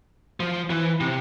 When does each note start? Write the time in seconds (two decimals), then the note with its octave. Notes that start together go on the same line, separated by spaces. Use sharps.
0.40 F3
0.70 E3
1.01 C3